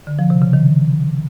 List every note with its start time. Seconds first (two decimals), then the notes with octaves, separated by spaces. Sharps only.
0.07 D3
0.19 F3
0.30 C3
0.42 C#3
0.53 D#3